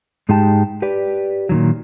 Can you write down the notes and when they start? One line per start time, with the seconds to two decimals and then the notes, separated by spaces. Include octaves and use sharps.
0.29 G#2 G#3 D#4 G4 G5 A5
0.82 G4 B4 D5
1.49 A#2 D#3 F#3